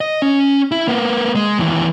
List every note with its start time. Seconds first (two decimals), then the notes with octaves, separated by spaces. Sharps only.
0.01 D#5
0.22 C#4
0.72 E4
0.88 A#3 B3
1.35 G#3
1.58 D#2 E3